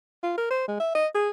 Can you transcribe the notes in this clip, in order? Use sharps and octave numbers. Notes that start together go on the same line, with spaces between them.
F4
A#4
C5
G#3
E5
D#5
G#4